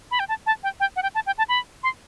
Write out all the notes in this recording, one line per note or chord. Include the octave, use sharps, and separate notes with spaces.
B5
G5
A5
A5
G5
G5
F#5
G5
A5
G5
A5
B5
C6